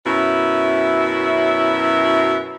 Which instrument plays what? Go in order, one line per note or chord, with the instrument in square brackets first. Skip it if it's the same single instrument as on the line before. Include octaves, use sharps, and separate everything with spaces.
[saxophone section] F#2 B2 C#4 E4 E5